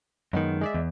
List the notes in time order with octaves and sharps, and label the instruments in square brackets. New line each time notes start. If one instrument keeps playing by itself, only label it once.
[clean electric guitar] F#2 D#3 [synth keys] G#3 B3
[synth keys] G#3 D5 E5
[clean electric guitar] E2